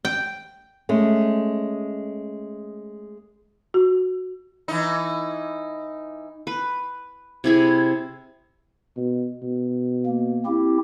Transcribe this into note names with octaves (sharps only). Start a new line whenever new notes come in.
G5
G#3 A3 C#4
F#4
E3 D#4
B4
C3 E4 G#4
B2
B2
A#3
C4 E4 G4